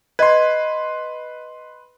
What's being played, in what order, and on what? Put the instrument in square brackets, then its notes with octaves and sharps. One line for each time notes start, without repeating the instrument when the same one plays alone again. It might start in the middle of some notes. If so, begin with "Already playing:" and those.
[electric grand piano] B4 C6 [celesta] D#5 G#6